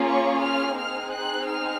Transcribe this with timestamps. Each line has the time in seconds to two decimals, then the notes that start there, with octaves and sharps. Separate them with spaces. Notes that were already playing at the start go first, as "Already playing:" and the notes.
Already playing: A#3 C#4 F4 G#4
0.08 C#6
0.43 F6
0.78 C4 D#4 G#4 F6
1.13 F#6
1.49 F6